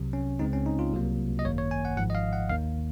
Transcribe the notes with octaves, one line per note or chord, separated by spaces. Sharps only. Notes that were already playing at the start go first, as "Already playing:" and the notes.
Already playing: C2 C3 F#3
C#4
C#2 C#3 G#3 C4 D#4
C#4
D#4
F4
C2 C3 F#3 A#3
D#5
G#1 F#2 D#3 A#3 C#5
C#5
G#5
F#5
G#1 G#2 F3 F#5
D#5
F5
F#5
D#2 D#3 A#3 F5